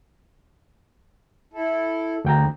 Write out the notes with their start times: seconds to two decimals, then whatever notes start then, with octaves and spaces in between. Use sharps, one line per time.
1.53 E4 A4
2.25 D2 G5 A#5